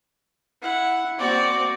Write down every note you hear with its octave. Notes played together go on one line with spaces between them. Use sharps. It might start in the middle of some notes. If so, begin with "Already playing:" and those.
E4 F#5
A#3 C4 F#4 D5